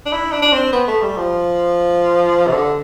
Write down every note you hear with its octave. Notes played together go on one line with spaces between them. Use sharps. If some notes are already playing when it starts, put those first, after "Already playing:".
D4
E4
D4
D4
C4
B3
A3
G3
F3
C3
D3